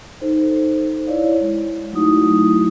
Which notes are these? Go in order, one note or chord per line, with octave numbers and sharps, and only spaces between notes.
D#4 A4 C5
E4 C#5 D5 F5
G#3
F#3 A3 D#4 E4 F#4 D#6